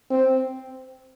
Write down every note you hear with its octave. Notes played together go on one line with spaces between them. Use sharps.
C4